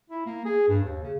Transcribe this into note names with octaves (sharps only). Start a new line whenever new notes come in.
E4
A#3
G#4
G2
D#2
C#3